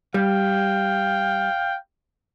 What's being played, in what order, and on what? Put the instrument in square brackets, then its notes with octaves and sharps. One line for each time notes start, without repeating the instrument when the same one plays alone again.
[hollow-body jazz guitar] G3 [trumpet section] F5 G5